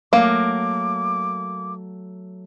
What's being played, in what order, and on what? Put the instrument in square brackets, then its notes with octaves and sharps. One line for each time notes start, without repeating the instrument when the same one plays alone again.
[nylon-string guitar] F#3 A3 F5 [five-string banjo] A#3 [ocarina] D6